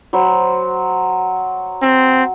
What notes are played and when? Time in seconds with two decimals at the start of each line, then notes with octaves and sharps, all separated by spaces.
0.13 F#3 C5 B5
1.82 C4